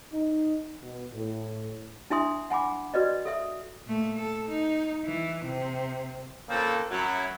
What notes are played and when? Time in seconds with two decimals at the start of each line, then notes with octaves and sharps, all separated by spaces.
0.13 D#4
0.82 B2
1.13 A2
2.10 D4 E4 E5 G#5 C6 D#6
2.50 F#5 G#5 B5 D6
2.94 F#4 B4 D5 D#5
3.25 A4 E5 D#6
3.85 A#2 A3
4.17 A4
4.49 D#4
5.05 E3
5.45 C3
6.49 A#2 C#3 A#3 C4 A4
6.91 F#2 F#3 E4